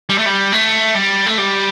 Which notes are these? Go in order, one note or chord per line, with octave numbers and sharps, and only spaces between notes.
G3
A3
G3
A3
G3
A3
G3